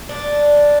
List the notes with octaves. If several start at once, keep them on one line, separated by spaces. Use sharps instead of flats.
D4